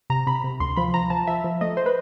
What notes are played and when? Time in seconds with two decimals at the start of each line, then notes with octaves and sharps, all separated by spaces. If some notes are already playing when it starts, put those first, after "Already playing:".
0.10 C3 A#5
0.27 C3 B5
0.44 C3
0.60 D2 C6
0.76 F3 B5
0.94 F3 A#5
1.10 F3 A5
1.27 F3 E5
1.44 F3
1.61 A3 D#5
1.77 C5
1.86 B4